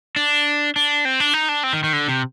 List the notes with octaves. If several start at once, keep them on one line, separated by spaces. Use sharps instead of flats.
D4
D4
C4
D4
D#4
D4
C4
D#3
D#3
D3
C3